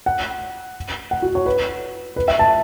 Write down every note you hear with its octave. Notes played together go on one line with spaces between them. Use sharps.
F#5
F#5
F#4
C#5
B4
B4
E5
A5